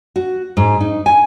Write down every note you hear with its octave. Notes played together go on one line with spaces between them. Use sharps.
F#4
G#2
D#4
G#5